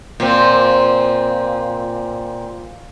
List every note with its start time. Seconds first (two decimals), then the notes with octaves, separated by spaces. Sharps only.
0.20 A#2 C4